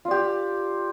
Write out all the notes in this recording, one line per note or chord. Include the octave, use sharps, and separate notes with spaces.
F4 G4 D5